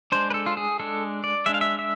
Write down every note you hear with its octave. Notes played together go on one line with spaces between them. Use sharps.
G#3 D4 C5
B4
A4
F4
G#4
G#3 D4 A4
D5
G#3 D4 E5
F5
E5
E5